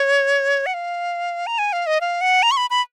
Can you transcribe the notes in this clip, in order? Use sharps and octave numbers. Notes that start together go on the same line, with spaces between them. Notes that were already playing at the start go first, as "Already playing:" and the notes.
Already playing: C#5
F#5
F5
A#5
G#5
F5
D#5
F5
F#5
A#5
C#6
B5
B5